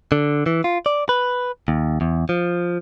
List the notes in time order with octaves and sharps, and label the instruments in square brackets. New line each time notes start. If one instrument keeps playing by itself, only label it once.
[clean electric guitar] D3
E3
F4
D5
B4
D#2
E2
F3